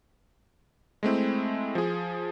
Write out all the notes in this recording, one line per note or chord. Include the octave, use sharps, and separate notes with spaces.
G#3 A3 C4 E4
F3 G#4